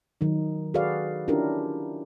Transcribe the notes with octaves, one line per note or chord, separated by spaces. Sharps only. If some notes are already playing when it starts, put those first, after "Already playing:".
D#3 F#3 D#4
F#4 G#4 A4 B4 D5 F5
C#4 D4 E4 F4 G4 A#4